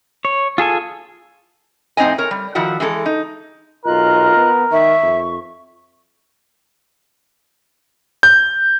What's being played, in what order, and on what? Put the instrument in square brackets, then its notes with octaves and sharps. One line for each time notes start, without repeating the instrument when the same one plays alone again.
[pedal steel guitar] C#5
F4 G#4 A4 G#5
[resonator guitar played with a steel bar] F2 A2 C4 D#4 D#5 G#5
A#4 C#5
G3
D#3 F3 E4 F#4 F#5
E3 G#3 G#4 A4
D#4
[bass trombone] B1 [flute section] F4 D#5 F#6 [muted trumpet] A#4
[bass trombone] B3
[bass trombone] D#3 [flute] E5 [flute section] C#6
[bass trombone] F2
[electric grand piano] G6